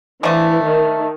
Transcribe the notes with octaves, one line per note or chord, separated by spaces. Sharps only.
D3 E3 F3 A3
D#3